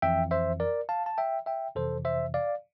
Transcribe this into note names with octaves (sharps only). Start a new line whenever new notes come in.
F2 E3 E5 G5
C5 E5
A#4 D5
F5 A5
A5
E5 G5
E5 G5
F2 C3 E3 A4 C5
C5 E5
D5 F5